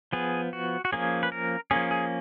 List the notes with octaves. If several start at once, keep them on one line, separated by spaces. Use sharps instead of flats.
F3 B3 G#4
F#4
F#4
F3 A#3 C#4 G#4
B4
A#4
F3 A#3 C#4 G#4
G#4